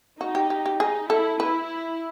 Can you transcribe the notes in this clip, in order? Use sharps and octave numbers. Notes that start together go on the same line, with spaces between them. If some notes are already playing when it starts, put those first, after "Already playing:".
D#4 F#4
G4
G4
G4
D#4 G#4
E4 A4
E4 B4